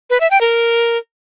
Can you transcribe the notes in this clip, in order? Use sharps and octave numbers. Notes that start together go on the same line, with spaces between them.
B4
E5
G5
A#4